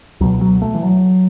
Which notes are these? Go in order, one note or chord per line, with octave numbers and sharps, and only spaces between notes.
C#2 B2 F#3
F#3
A3
E3
F#3